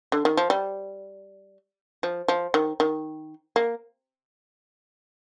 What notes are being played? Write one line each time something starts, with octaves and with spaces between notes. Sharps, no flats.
D3
D#3
F3
G3
F3
F3
D#3
D#3
A#3